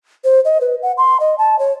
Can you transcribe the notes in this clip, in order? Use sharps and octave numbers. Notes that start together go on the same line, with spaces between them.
C5
D#5
B4
F#5
C6
D#5
A5
C#5